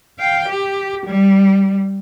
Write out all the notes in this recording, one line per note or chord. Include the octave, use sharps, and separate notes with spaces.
F5 G5
G4
G3